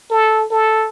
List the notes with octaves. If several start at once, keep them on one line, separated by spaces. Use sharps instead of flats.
A4
A4